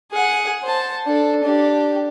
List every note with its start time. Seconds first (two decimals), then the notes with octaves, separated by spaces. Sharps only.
0.11 G#4 F#5
0.63 C5 A5
1.06 D4 A4
1.43 D4 G4